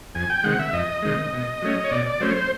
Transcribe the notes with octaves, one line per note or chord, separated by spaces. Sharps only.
F2 G#5
G5
C3 D#3 G#3 F#5
E5
F2 D#5
C3 D#3 G#3
B2
F#3 A3 C#4
C#5
B2 D5
D5
F#3 A3 C#4 C5
C5